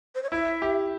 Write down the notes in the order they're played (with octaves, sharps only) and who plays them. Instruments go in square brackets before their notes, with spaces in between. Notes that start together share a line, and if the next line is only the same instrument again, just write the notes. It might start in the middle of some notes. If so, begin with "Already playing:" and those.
[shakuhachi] C5
C#5
[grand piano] E4 [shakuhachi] E5
[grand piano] G4